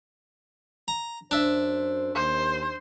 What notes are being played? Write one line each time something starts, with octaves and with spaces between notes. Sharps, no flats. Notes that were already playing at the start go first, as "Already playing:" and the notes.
A#5
F#2 D4 C5 E5
D#2 C5